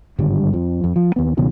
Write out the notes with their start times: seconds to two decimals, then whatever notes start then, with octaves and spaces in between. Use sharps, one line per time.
0.19 G#1 G2 D3 G3
0.53 F2 F3
0.84 F2
0.96 F3
1.16 D#2 B3
1.37 C#2 B2 D#3 F#3